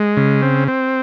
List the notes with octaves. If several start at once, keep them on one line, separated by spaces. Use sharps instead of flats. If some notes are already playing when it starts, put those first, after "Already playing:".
Already playing: G#3
C#3
C4
C4